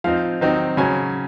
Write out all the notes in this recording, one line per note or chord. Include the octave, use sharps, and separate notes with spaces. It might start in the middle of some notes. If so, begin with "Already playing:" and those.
F3 C4 D#4 F5
D#3 F#3 C4 D#4
C#3 F#3 C#4 G#5